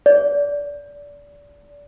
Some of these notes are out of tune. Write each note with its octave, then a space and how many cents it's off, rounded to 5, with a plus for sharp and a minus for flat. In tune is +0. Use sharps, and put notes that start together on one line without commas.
D5 -25